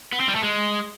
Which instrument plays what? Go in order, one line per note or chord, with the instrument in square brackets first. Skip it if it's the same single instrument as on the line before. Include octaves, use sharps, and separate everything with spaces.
[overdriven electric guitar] B3
C4
G3
A3
G#3